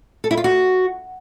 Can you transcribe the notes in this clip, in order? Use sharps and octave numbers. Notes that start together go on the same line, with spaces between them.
A4
E4
F4
F#4